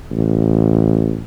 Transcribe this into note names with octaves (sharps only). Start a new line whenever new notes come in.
A1